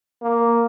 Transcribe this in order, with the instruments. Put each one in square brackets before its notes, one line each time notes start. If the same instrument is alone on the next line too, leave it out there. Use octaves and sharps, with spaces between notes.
[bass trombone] A#3